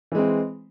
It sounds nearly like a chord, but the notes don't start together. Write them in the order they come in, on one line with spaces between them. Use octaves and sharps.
E3 G#3 C4